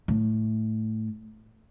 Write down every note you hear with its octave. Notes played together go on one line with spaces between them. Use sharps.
A2